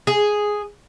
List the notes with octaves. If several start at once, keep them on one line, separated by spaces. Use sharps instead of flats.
G#4